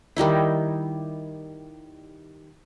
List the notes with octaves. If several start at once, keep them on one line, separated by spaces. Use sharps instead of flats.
D#3 G3 D#4 E4